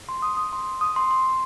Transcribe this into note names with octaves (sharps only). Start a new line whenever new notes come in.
C6
D#6
D#6
C6
D#6
C6
C6